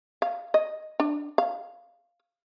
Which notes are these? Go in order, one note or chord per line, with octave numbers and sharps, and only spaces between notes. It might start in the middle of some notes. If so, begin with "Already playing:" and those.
F5
D#5
D4
F5